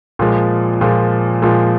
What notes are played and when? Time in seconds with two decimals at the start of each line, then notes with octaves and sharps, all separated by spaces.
0.19 A#2 F3 G#3
0.81 A#2 F3 G#3
1.42 A#2 F3 G#3